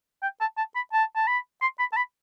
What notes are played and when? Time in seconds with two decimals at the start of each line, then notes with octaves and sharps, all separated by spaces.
0.22 G5
0.40 A5
0.57 A5
0.75 B5
0.92 A5
1.15 A5
1.27 B5
1.61 C6
1.79 B5
1.92 A5
1.96 B5